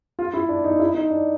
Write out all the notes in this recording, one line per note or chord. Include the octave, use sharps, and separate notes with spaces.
F4
E4
D4
D#4
E4
D#4
D4